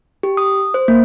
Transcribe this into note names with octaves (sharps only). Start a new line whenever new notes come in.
G4
D#6
C5
A#3